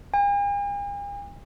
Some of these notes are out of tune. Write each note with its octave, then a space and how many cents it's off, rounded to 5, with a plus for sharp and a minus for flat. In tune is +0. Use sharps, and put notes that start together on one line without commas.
G#5 -45